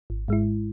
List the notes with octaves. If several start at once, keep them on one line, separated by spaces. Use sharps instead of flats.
G#1
G#2 G#3 E4